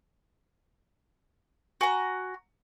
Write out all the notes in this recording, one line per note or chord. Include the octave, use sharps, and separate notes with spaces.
F#4 G#5 A#5